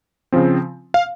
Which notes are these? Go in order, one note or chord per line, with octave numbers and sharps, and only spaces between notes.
C#3 F3 C4
F5